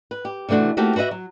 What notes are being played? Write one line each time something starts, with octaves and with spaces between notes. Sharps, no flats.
B4
G4
C3 E3 A3 D4 F#4
A3 A#3 C4 D#4 F#4 G4
F#4 B4 C5 D#5 E5
F#3